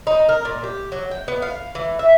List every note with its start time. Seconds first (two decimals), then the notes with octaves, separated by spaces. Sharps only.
0.07 D#4
0.29 A#4
0.45 A#2
0.64 G4
0.92 F#3
1.11 G5
1.28 B3
1.42 F5
1.75 E3
1.99 E5